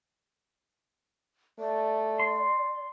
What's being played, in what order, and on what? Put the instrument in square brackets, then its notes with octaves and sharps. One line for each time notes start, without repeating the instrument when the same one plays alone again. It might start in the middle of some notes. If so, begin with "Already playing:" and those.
[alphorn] A3 [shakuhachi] D5
[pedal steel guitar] C6